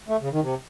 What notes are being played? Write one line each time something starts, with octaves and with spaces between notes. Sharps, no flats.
A3
C#3
D#3
C3